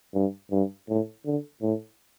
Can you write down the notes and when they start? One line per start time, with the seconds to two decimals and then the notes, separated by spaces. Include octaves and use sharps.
0.14 G2
0.51 G2
0.89 A2
1.26 D3
1.62 A2